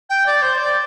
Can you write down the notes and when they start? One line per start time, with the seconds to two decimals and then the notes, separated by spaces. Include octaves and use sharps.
0.09 G5
0.26 D5
0.42 C5
0.58 D5